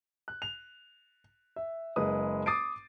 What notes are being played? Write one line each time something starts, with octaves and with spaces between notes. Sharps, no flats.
F#6
F7
E5
F#1 G#3 B4 D#6
D6 D#6 A6 C7 D7